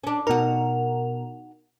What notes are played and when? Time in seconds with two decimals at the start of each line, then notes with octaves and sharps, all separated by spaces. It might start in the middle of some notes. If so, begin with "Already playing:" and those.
0.04 C#4 D4
0.27 B2 D#4 F#4 A#4